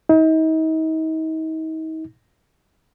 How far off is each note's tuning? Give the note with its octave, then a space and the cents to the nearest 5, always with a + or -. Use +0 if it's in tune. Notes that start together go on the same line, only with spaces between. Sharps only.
D#4 +40